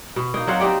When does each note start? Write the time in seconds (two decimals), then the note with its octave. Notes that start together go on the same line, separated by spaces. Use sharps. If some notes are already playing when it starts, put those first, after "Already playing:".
0.16 B2
0.34 A#3 D#4
0.47 F#3 C4 F5 F#5
0.60 C4 D#4 G4 D5